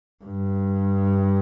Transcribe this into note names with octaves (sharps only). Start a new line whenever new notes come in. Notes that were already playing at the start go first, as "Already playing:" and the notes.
G2